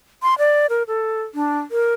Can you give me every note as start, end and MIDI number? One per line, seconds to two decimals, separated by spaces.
0.23 0.34 84
0.39 0.66 74
0.70 0.83 70
0.88 1.22 69
1.35 1.58 62
1.71 1.94 70